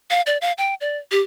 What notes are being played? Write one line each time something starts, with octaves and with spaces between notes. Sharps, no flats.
F5
D5
F5
G5
D5
G4